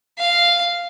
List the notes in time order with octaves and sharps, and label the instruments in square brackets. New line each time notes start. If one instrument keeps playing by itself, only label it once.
[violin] F5